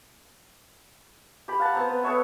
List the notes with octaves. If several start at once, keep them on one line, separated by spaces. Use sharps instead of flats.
G4 B5
F5 F#5 A5
B3 C4 A#5
B3
B3 A4 C#5 E5